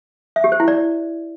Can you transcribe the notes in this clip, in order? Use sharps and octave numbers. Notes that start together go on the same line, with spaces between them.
E5
G4
C5
E4
D5